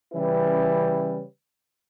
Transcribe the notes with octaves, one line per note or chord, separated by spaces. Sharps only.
C#3 E3 G3 C#4 E4 B4